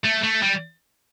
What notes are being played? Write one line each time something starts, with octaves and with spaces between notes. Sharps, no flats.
A3
A3
G3